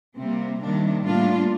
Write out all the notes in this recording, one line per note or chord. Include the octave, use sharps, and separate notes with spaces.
C3 G3 A#3 C4
C3 D#3 G3 A#3 D4
A2 G3 A#3 D4 F4